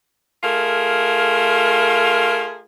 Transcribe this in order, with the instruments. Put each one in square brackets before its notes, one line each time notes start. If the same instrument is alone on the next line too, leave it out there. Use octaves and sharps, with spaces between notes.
[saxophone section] A3 F4 G#4 A#4